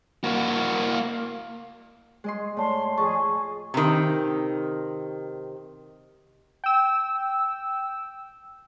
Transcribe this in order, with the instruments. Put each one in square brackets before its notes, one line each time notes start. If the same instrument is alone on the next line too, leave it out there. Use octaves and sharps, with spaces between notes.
[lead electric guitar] A#3 F#4
[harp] G#3 D#5 C6
[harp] A2 [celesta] D5 A5 [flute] C6
[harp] F2 A5 [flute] G#4 [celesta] C#6
[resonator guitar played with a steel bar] C3 D#3
[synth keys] G5 E6